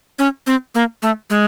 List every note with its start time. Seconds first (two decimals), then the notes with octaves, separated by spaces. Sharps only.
0.19 C#4
0.47 C4
0.75 A#3
1.02 A3
1.30 G#3